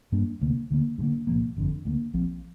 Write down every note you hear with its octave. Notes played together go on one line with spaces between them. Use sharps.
G2 G3 A#3 D4
D2 C3 A#3
D2 D3 A#3
G2
D3 A#3
C2 A#2 F3 A#3
G1 F2 D3
D2 D3 A#3
A#1 A#2 F3 C4